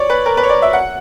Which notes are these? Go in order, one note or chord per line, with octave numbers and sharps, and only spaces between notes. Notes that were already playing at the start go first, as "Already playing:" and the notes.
Already playing: C#5 D5
B4
A#4
B4
C#5
D5
E5
F#5